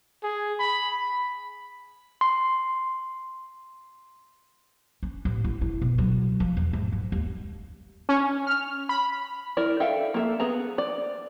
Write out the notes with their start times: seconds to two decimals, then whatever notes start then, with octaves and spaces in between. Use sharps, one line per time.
0.23 G#4
0.59 B5
2.21 C6
5.03 C#4
5.25 A1
5.44 E4
5.61 E4
5.82 B2
5.98 F#3
6.40 F3
6.57 E2
6.73 G#2
6.92 F#2
7.12 D#2
8.09 C#4
8.47 F6
8.89 B5
9.57 E4 A#4 D5
9.80 A4 E5 F5 G5
10.14 A#3 A4 E5
10.40 B3 G#4 A#5
10.78 D5